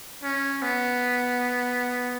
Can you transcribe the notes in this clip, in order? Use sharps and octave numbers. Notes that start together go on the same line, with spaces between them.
C#4
B3